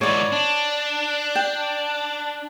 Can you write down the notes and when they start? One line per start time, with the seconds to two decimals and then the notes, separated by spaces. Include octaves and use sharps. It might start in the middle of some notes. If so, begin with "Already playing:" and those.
0.01 G#2 E3 C#5 D5
0.32 D4
1.35 G5